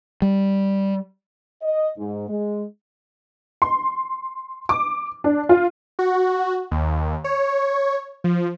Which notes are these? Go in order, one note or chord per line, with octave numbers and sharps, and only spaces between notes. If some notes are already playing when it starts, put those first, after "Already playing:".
G3
D#5
G#2
G#3
C6
D6
D4
F4
F#4
D#2
C#5
F3